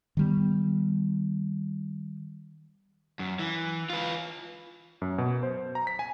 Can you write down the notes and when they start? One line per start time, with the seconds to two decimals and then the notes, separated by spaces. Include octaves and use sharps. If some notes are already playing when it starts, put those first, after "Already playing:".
0.17 D#3 G3 B3
3.19 F#2
3.39 E3
3.90 F4 B4
5.02 F#2
5.18 B2
5.43 C5
5.75 A#5
5.87 B6
5.99 G#5